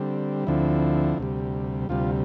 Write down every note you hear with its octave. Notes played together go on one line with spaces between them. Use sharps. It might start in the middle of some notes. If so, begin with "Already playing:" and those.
Already playing: D3 G3 C4
D2 D3 F3 C4 E4
D2 C3 G3
D2 C3 G3 F4